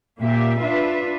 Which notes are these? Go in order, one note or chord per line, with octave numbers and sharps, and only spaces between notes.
A#2 A#3 G4 E5
D4 F4 B4 E5